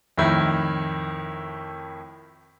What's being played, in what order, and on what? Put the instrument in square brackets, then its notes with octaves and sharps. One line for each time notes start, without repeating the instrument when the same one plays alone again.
[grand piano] F2 A2 D#3 E4